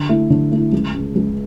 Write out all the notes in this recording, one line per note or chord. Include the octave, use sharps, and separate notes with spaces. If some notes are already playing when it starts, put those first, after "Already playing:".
Already playing: D3
A3 E4
D3
A3 E4
C#2
C#3 G#3
C#2